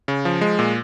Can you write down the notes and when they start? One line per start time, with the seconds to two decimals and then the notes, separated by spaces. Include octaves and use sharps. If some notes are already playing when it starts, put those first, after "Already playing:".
0.08 C#3
0.25 F3
0.41 G#3
0.59 A#2